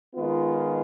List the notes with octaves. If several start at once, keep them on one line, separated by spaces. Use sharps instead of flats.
D#3 G#3 B3 F4